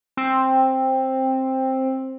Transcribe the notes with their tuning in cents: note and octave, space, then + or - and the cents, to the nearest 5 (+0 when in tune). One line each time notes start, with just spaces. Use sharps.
C4 +10